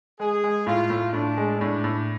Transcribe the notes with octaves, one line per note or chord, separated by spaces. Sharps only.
G#3 G#4
G#3
A2 F4
A2
A2 D4
G#3
A2 D4
A2